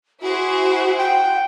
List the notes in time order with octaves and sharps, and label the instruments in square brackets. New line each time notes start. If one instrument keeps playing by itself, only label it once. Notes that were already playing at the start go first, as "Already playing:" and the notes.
[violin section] E4 G#4 C5 [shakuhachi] F#4
[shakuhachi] F#5 [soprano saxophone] G5